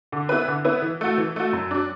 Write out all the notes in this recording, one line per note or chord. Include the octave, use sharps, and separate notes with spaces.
D3
B3 E4 B4
D3
B3 E4 B4
E3
A3 F#4
E3
A3 F#4
F#2
F#3 D4